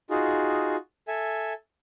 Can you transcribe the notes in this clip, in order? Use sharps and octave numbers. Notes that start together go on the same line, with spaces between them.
D#4 F4 F#4 G#4
A4 E5 G#5